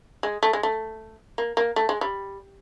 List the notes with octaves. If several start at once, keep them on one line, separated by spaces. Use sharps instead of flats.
G#3
A3
G#3
A3
A#3
A#3
A3
G#3
G3